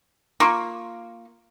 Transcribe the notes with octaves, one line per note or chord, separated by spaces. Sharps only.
A#3 F4 C#6